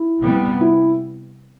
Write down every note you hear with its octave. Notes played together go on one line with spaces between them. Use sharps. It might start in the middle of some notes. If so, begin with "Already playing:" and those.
Already playing: E4
C3 G3 B3
E4